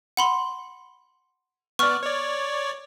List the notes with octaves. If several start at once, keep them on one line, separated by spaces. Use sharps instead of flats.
F#5 B5 C6
B3 D5 C#6 F6
C#5 D5